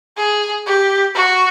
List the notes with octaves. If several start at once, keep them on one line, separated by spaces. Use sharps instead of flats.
G#4
G4
F#4